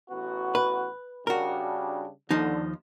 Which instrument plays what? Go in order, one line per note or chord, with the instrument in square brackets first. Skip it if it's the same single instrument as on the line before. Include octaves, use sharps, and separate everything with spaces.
[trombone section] A1 B3 F#4
[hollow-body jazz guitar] B4
[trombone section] C#3 G3 D4 [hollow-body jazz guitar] F#4 A#4
[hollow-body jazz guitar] D#2 F3 D#4 [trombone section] D3